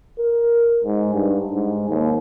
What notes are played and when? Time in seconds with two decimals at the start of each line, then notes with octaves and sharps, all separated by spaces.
0.19 A#4
0.84 G#2
1.14 G2
1.52 G#2
1.89 D#2